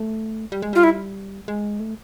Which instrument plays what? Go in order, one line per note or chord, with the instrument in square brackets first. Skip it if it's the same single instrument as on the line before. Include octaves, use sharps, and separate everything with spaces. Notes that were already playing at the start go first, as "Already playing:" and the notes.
Already playing: [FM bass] A3
G3
G#3
[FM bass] G3 [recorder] F4
[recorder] E4
[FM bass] G#3
A3